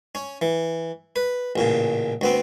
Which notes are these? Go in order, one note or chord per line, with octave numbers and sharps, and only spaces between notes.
C#4
E3
B4
A1 A#2 C#3
D2 B3 C4